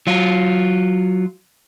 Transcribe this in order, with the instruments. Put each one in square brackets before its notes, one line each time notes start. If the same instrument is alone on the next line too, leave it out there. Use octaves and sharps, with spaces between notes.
[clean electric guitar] F#3 F4